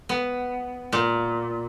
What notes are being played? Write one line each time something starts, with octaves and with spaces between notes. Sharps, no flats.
B3
A#2